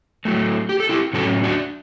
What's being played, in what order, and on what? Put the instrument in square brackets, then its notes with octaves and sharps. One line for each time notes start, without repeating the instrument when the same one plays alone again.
[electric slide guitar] A2 F#3 A3
G4
A4
E4 G4
A2 F#3 C#4 F#4 A4
D4 F#4